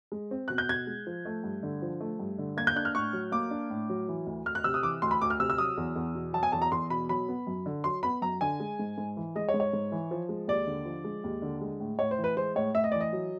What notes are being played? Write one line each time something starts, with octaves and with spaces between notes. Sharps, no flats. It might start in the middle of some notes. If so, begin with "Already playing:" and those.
G#3
C4
B2 F#6
G6
B2 G#6
G#3
F3
A3
G2
D3
F3
A3
G2
D3
A#3 G#6
G6
D4 F#6
F6
A2 C#6
F#3
A#3 D6
D4
A2
F#3
E3
D2
D2 F6
F#6
C3 E6
D#6
E3 D6
D2 C6
B5
D2 D6
F6
C3 E6
E6
F#3 D#6
E2
E2
B2
F#3 A5
G#5
E2 A5
A#5
E2 C6
B2 B5
F#3 B5
B3
F#2
D3
F#3 C6
B3 B5
F#2 A#5
D3 G#5
G#3
G#2
G#2
E3
G#3 D#5
C#5
G#2
C#5
G#2
E3
F3
G#3
D#2 D5
D3
F3
G#3
D#2
D3
G#3
A2
A2 C#5
C5
E3
B4
G#3 C5
A2 C#5
A2 E5
D#5
E3 D5
D#5
F#3